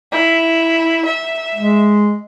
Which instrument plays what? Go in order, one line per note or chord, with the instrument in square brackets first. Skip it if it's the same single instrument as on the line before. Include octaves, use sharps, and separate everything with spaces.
[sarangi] E4
E5
[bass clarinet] G#3